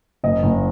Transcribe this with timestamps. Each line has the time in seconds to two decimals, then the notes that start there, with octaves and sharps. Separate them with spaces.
0.24 F#1 D#5
0.43 F#1